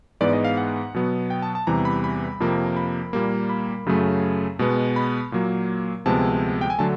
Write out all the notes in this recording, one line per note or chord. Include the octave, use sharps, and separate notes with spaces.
G#2 E3 G#3 B3 D5
D#5
F5
F#5
B2 F#3 B3
G5
A5
A5
E2 C3 E3 G3 A#5
B5
B5
F2 C3 F3 A#3
B5
A#2 G3 A#3
B5
F#2 C#3 F#3 A3
B2 G#3 B3
B5
A#2 F#3 A#3
D2 C3 F3 G#3 B3 A5
G5
G#5
D3 F#3 A3 A5